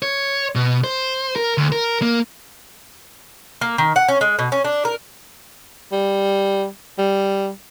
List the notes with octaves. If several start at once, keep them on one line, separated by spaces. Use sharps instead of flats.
C#5
B2
C5
A#4
D2
A#4
A#3
A#3
D#3
F#5
C#4
G#3
B2
C#4
D4
A#4
G3
G3